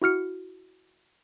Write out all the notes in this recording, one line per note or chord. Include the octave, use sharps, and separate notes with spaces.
E4 F#4 F6 C#7